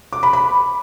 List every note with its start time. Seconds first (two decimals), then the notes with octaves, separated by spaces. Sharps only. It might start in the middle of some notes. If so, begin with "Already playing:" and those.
0.13 D6
0.23 B5
0.33 B5